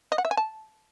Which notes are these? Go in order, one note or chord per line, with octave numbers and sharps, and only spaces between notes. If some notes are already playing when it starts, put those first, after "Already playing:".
D#5
F#5
E5
G#5
A5